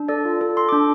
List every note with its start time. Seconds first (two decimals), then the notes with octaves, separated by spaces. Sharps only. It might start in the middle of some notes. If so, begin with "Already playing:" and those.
Already playing: D4
0.08 A4 D5
0.25 F4
0.41 A4
0.57 A4 C6
0.69 D6
0.73 D4